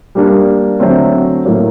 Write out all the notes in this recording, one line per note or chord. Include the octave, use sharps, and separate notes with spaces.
G3 A#3 D4
D3 F#3 A3 C4
A2 F#3 A#3